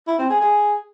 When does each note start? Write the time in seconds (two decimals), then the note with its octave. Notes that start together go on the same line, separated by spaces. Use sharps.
0.07 E4
0.19 C4
0.30 G#4
0.41 G#4